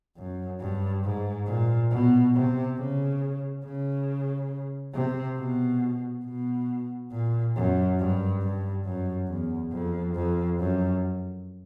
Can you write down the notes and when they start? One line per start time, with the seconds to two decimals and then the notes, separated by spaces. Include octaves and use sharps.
0.17 F#2
0.60 G2
1.04 G#2
1.47 A#2
1.91 B2
2.34 C3
2.78 C#3
3.64 C#3
4.94 C3
5.38 B2
6.25 B2
7.12 A#2
7.55 F#2
7.99 G2
8.42 G2
8.85 F#2
9.28 E2
9.71 F2
10.15 F2
10.58 F#2